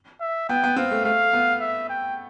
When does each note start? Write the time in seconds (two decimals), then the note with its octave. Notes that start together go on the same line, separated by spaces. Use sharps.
0.21 E5
0.49 B3 G5
0.63 B3
0.76 C4 F5
0.91 A3
1.05 A3 F5
1.33 B3
1.61 E5
1.90 G5